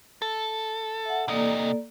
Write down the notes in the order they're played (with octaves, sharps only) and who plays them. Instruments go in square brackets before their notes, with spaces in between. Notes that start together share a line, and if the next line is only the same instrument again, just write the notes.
[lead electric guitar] A4
[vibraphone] E5 F#5
[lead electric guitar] C3 D#5 [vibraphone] A#3 A4 D5